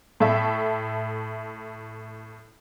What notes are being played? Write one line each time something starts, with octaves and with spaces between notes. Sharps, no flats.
A2 A4 E5 C#6